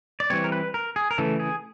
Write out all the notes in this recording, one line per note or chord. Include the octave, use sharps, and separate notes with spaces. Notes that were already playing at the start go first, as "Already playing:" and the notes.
D5
E3 G3 C4 C#5
A#4
B4
A#4
G#4
A#4
C#3 E3 A3 A4
G#4